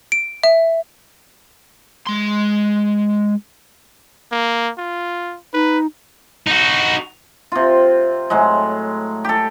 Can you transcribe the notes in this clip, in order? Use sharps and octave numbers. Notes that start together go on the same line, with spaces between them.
D7
E5
G#3 C6
A#3
F4
D#4 B4
D#4 F#4
C3 F4
A2 F#3 G#3
G4 A4